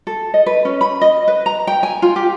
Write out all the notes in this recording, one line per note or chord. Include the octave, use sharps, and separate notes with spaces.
A4
D#5
B4
C#4
B5
D#5
B4
A#5
G5
G#5
F4
G4